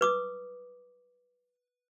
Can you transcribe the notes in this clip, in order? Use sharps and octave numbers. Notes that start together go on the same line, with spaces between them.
B4 D6 D#6